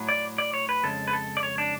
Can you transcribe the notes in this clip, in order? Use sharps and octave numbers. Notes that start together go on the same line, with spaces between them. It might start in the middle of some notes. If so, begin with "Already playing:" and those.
Already playing: A2 F#3
D5
D5
C#5
B4
F2 C#3 G#3 A4
B4
A4
D5
C#5
D4